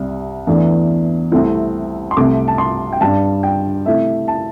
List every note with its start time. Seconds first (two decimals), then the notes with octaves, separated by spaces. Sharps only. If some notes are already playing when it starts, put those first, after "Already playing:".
Already playing: C2 C3 G3
0.47 E2 E3 A3 D4
1.31 C2 C3 A3 C4 E4
2.11 C6
2.17 C2 C3 A3 D6
2.48 A5
2.58 C6
2.93 G5
3.01 G2 G3 D4 A5
3.43 G5
3.86 C3 A3 E4 E5
4.28 A5